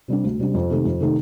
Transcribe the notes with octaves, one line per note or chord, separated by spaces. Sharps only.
C3 G3 D4
D2
C3 G3 D4
F2
C3 D#3 A3 D#4
F2
C3 D#3 A3 D#4